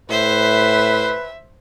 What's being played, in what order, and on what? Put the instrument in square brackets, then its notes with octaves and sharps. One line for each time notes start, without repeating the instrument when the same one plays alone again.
[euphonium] A2 [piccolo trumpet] B4 [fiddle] C5 [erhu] E5